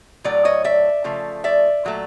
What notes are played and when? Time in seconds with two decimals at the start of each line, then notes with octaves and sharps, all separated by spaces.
0.24 A2 F#3 A3 D5
0.45 C#5 D#5
0.64 D5 E5
1.04 C#3 F3 A3
1.44 D5 E5
1.85 A#2 F#3 A3